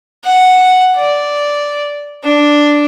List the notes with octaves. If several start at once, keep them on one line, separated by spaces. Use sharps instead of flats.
F#5
D5
D4